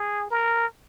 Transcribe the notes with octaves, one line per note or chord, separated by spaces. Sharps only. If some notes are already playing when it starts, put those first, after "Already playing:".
Already playing: G#4
A#4